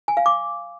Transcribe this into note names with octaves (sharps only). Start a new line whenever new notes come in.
G#5
F5
D6